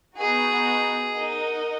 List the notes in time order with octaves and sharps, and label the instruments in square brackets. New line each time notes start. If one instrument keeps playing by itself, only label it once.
[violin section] B3 D#4 F#4 [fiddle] G#4
[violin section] D#4 A#4 D#5 F#5